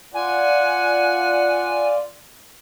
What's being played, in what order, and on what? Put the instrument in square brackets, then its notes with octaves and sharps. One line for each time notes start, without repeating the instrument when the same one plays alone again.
[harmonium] F4 D5 [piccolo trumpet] F#5 [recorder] G#5